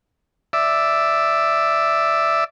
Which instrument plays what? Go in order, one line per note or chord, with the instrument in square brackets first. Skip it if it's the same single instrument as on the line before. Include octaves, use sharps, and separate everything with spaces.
[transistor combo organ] D5 E5